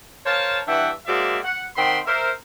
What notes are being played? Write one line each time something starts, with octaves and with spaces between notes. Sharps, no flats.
A#4 C5 C#5 F5 A5
G2 E3 D4 E5 F#5 G5
G#3 A#3 F#4 C5 D5 E5
F#5
D#3 C4 F#5 G5 B5 C6
A#4 C5 E5